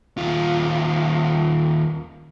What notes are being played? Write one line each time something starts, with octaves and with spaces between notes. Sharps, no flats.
D#2 F4